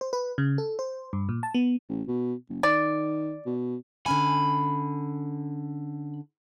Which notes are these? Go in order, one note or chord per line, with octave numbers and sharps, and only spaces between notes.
C5
B4
C#3
A4
C5
G2
A#2
A5
B3
A1
B2
F#1
D#3 D5
B2
D3 C#4 G#5 B5